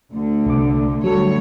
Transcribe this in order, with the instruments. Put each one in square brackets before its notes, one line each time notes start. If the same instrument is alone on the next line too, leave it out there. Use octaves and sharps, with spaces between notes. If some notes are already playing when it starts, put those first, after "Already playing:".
[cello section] D2 D3
[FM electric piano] C2 D6
[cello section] D2 G3 C#5 [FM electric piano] F#3 A4